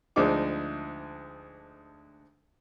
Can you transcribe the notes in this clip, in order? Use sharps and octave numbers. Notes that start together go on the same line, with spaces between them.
D2 F3 G#3 D4 D#4 D6